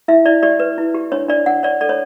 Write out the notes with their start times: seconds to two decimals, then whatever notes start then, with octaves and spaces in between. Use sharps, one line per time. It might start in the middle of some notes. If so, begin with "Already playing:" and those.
0.08 E4 E5
0.26 E4 D5
0.43 G4 D5
0.60 B4
0.78 E4
0.95 G4
1.12 D4 C#5
1.28 D4 D5
1.46 D4 F#5
1.63 C#5 D5
1.81 A4 D5
1.89 C#5